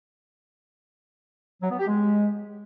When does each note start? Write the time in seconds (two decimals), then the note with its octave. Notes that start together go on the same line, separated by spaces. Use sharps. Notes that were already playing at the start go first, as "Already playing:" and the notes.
1.62 F#3
1.70 B3
1.79 G4
1.87 G#3